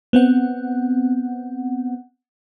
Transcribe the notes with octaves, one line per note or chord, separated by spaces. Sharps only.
B3 C4 F#5